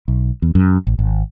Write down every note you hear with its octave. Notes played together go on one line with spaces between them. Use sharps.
B1
E2
F#2
A1
G#1